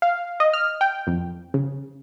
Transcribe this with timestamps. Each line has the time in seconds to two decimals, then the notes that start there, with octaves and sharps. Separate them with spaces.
0.02 F5
0.40 D#5
0.53 F6
0.81 G5
1.07 F2
1.54 C#3